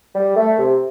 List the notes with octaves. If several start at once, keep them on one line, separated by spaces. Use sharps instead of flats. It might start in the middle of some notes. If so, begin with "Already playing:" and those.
G3
A3
C3